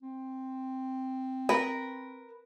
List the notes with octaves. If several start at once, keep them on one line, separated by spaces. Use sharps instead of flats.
C4
A#4 B4